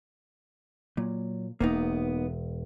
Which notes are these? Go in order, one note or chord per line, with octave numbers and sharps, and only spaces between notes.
A#2 F#3
E1 A#3 B3 D#4